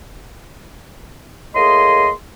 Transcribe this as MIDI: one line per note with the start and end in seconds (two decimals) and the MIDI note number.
1.55 2.11 45
1.55 2.11 58
1.55 2.11 68
1.55 2.11 75
1.55 2.11 84